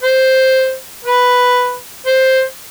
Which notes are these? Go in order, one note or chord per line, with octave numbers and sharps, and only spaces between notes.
C5
B4
C5